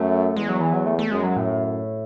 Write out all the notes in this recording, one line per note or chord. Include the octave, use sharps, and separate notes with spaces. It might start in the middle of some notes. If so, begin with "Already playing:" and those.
Already playing: F#2 A3
E2 G#3
F#3
E3
F#3
A3
A3
F#2 G#3
F#3
A2